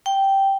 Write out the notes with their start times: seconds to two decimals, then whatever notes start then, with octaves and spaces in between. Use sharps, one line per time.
0.06 G5